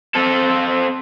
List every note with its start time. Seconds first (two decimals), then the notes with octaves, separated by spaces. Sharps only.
0.15 C4 A4